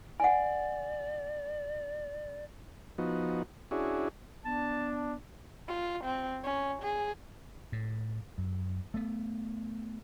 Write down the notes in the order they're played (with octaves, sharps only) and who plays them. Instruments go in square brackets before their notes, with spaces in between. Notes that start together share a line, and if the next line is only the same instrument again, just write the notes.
[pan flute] D5 [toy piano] F#5 G#5
[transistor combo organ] F3 B3 D#4 F#4
C#4 D4 E4 F#4 G#4
[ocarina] B3 [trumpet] D4 [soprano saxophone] A5
[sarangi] F4
C4
C#4
G#4
[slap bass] A2
F#2
A3 B3